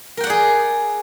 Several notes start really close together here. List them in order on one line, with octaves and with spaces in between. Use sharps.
A#4 G5 F#5 D5 G#4